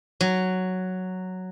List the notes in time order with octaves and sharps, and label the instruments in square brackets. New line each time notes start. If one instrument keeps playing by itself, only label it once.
[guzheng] F#3